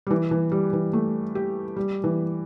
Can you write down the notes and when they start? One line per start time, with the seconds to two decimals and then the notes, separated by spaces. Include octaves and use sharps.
0.07 G3
0.11 E3
0.31 E3
0.52 G3
0.73 E3
0.93 A3
1.35 G4
1.77 G3
2.04 E3